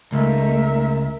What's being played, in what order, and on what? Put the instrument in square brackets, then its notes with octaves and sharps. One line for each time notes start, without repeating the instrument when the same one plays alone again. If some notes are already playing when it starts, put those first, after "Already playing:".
[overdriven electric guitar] C#2 [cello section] A3 A#3 D#4 [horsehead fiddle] A#4 E5